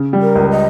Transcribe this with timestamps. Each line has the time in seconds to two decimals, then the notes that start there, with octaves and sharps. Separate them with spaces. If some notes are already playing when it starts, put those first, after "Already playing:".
Already playing: C#3
0.13 G3
0.21 A#4
0.36 C#2
0.50 D#5